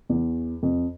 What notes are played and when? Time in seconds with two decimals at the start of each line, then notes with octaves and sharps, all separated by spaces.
0.09 E2
0.63 F2